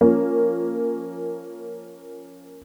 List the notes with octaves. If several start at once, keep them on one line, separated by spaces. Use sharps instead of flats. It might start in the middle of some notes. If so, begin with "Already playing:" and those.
F3 A#3 C#4